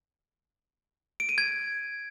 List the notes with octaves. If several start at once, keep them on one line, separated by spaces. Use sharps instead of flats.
D7
D#7
G#6